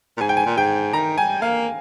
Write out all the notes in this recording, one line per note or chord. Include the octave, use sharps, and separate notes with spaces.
A#2
G#2 G#5
G5
G#5
A#2
G#2 G5
D#3 A#5
G3 G#5
A#3 F5